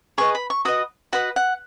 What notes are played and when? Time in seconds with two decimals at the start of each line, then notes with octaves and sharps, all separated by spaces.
0.18 G#4 B4 D#5 C#6
0.35 B5
0.50 C#6
0.65 F#4 B4 D#5 D#6
1.13 F#4 B4 D#5 F#5
1.36 F#5